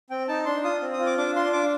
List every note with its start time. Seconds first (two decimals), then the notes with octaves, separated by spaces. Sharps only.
0.10 C4 G5
0.28 D#4 A5
0.45 D4 C6
0.64 F4 D#6
0.81 C4
0.93 D#6
0.99 F4
1.06 D6
1.17 D4 D6
1.36 F4 C6
1.53 D4 D6